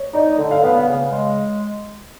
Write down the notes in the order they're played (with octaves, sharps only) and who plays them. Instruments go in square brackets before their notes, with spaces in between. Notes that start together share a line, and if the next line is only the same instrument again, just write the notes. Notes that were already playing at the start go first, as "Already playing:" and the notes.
Already playing: [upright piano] C#5
[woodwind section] D#4 [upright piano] D5
[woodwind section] D3
[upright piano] F5
[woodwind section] B3 [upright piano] F5
[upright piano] F5
[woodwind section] C#3
G#3